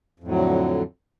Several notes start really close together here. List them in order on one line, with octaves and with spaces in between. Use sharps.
F2 A2 F#3 D3